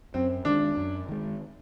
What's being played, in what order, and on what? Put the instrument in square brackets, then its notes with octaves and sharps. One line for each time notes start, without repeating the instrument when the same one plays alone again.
[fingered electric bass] F#2 [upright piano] C4
[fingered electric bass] D#3 G#3 [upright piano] D4
[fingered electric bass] F#2
D#3 G#3